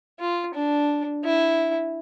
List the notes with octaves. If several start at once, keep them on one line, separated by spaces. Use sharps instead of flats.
F4
D4
E4